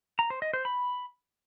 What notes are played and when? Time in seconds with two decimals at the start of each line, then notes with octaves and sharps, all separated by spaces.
0.19 A#5
0.30 C5
0.42 D#5
0.53 C5
0.65 B5